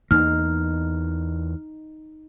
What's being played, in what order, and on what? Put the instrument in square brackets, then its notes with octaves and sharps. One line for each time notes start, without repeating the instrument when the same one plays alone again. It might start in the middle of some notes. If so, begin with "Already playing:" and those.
[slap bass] E2 A#3 [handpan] D#4 [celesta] F6